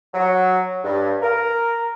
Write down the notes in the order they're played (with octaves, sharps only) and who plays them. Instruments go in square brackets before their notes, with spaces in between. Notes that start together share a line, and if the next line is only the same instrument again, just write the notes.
[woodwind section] F#3
G2
A#4